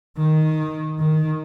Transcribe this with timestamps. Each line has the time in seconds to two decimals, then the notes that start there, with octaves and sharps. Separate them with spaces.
0.18 D#3
0.99 D#3